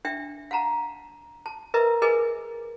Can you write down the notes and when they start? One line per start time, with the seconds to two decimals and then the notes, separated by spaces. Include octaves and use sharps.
0.05 D4 E5 G5
0.51 F5 F#5 A5 A#5
1.46 A5
1.74 A#4 B4 D#5 E5 A#5
2.02 G#4 A#4 B4 D#5 G#5